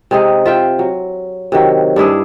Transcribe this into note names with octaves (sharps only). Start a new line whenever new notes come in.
C3 G#3 D#4
F4 E5 G5
F#3
C3 D#3 F#3
G2 D4 E4 G#4